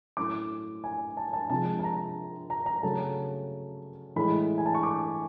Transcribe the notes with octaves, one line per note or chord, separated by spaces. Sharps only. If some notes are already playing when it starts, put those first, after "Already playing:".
A2 F#3 A3 C#4 E4 D6
G#5
A5
A5
C3 F3 G#3 A5
A5
A#5
A#5
A#5
C#3 F#3 A3 C#4 A5
A2 E3 G#3 B5
G#5
A5
C#6
D6